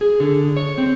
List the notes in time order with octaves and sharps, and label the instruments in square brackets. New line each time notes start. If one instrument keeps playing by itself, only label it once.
[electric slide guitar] G#4
D3
C#5
C4